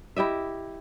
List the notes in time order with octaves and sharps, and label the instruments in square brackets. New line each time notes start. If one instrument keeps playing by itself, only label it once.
[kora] E4 G4 D#5 E5